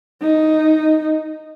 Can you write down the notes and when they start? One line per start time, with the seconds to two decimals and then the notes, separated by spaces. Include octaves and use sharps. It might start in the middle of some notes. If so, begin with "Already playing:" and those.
0.22 D#4